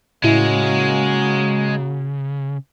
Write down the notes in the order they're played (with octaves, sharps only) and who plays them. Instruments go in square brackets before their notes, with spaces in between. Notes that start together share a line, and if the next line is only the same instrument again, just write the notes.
[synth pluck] A2 E4 [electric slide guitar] C#3 [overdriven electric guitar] G#3 [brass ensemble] A#3 C#4 F#4